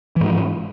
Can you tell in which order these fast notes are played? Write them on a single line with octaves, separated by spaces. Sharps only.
E3 G#2 F3